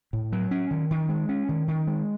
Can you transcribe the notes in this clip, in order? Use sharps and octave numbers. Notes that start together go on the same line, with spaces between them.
A2
F#3
C#4
D#3
D#3
G#3
C#4
D#3
D#3
G#3